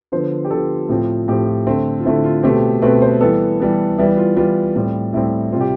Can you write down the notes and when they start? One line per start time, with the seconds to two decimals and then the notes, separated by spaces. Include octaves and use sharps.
0.12 D3 F3 B3 C5
0.45 G4
0.50 D3 F3 B3 A4
0.89 A2 F3 C4
1.28 A2 F3 C4 G4
1.46 F4
1.67 D3 A3 C4
2.00 F4
2.05 D3 A3 C4 E4
2.24 F4
2.43 B2 A3 C4 G4
2.82 B2 A3 C4 B4
3.02 C5
3.21 E3 G3 B3 A4
3.60 E3 G3 B3
3.98 E3 G3 B3 E4
4.17 F4
4.36 E3 G3 B3 F4
4.76 A2 G3 C4
5.13 A2 G3 C4 E4
5.52 C3 G3 C4 F4
5.61 G4